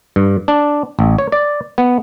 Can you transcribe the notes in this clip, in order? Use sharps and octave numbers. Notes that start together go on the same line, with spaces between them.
G2
D4
A1
C#5
D5
B3